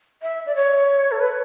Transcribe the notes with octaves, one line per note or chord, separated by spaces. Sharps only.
E5
D5
C#5
A4
B4